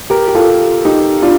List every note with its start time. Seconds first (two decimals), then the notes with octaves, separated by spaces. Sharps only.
0.10 G4 A#4
0.28 G4
0.35 F4 A4
0.85 D#4 G4
1.22 D4 F4